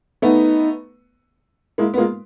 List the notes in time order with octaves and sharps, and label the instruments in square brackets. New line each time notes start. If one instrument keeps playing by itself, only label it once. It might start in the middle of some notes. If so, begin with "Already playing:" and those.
[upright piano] A3 B3 [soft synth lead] D#4
[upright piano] G#3 A#3 [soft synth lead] E4
[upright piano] B3
[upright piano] G#3 A#3 [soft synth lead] F4